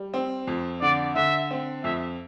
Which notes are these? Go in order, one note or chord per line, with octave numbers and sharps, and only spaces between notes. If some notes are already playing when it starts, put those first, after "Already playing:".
Already playing: G3
C4
F2
D3 D5
D3 E5
C4
F2 E5